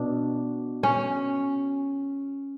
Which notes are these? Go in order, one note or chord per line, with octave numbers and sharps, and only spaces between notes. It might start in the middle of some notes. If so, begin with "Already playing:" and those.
Already playing: B2 D4
C#4